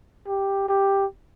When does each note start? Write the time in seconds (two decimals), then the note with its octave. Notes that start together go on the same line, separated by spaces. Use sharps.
0.27 G4
0.69 G4